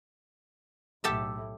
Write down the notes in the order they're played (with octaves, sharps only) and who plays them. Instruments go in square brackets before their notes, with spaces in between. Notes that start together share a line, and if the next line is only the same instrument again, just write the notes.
[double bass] B1 A2 [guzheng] G4 A4 E5